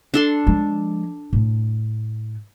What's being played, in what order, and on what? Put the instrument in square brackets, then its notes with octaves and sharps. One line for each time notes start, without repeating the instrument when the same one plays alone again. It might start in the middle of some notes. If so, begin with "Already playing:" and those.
[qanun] D4 A4 C6
[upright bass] F3 G#3
A2